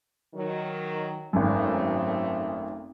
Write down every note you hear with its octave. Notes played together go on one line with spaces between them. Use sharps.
D#3 F#3
G#1 F#2 F#3 A3 C4